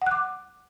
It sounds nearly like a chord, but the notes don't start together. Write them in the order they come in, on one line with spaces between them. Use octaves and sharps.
F#5 F#6 D6